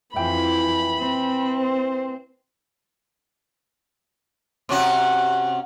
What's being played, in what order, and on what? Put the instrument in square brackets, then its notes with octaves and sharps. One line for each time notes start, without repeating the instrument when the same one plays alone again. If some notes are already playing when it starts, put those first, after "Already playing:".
[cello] F2 [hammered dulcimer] E3 G5 [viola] B5
[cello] C4
[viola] C5
[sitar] C3 C#4 F#4